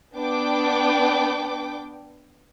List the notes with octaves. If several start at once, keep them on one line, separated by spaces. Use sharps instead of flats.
B3 D4 G5 D6